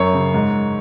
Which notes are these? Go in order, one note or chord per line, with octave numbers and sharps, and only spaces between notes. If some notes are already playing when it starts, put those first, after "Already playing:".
Already playing: F#2 C#5
C#3
G#2